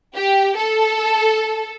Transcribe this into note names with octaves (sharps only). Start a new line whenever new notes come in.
G4
A4